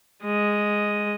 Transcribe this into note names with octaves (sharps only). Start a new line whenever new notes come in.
G#3 D#5